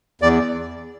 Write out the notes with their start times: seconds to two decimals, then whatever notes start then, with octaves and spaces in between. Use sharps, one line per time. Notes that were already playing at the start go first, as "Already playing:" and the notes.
0.22 E2 D5